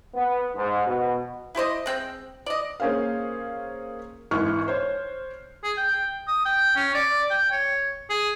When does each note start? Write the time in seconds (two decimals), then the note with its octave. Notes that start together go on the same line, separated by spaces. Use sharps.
0.15 B3
0.55 G#2
0.87 B2
1.55 E4 G4 C5 D#5
1.86 G#3 C4 G5
2.46 D5 D#5
2.80 A#3 C#4 G#4 C5 F5
4.31 G#1 E3 C#6 F6 F#6
4.68 C5 C#5
5.64 G#4
5.77 G5
6.28 D#6
6.46 G5
6.76 C#4
6.95 D5
7.31 G5
7.52 C#5
8.10 G#4